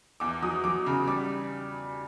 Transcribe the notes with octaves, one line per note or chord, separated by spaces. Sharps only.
E2 D6
F#3 D#6
F#3 D6
C#3
G3 D6